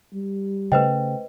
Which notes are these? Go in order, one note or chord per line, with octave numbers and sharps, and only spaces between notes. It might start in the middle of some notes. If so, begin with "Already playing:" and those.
G3
C#3 A3 B4 C5 D#5 G5